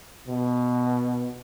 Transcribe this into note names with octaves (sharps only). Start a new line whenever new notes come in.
B2